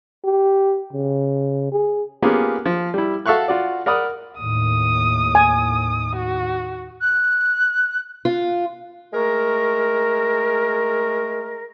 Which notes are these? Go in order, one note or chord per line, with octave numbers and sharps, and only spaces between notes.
G4
C#3
G#4
A#3 B3 C#4 F4 G4 G#4
F3
G3 E4
F#4 A4 E5 F5 C#6 F#6
F4 F#4 D5
A#4 D5 F#5 B5 D#6
D#2 A2 D#6
G#5
F#4
F#6
F4
G#3 A3 A#4